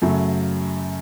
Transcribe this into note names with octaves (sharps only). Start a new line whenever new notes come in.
F#2 C#3 F#3 A3